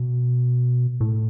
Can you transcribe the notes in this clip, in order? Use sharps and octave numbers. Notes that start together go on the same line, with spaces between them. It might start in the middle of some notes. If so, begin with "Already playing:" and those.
Already playing: B2
A2